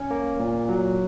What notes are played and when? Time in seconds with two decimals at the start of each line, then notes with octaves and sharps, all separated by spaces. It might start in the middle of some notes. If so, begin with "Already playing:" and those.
Already playing: C#4
0.11 A#3
0.40 A#2
0.69 F#3